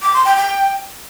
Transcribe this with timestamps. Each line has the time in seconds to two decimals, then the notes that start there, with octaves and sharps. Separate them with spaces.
0.02 D6
0.13 C6
0.25 G5
0.36 G5